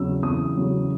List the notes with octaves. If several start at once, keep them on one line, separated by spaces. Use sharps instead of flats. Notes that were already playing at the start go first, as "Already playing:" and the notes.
Already playing: E2 C#3 F#3 E6
E2 D#6
C#3 F#3